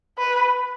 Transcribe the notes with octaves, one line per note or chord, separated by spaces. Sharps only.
B4